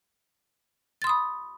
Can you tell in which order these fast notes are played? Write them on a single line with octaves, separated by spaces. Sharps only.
A6 C6 D#6 B5